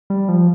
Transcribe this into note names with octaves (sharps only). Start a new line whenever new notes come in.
G3
F3